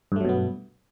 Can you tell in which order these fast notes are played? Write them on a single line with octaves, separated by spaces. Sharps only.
G2 A3 F#3 B2 B3